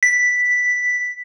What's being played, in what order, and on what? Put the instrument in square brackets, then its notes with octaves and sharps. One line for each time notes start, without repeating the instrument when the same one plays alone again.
[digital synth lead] B6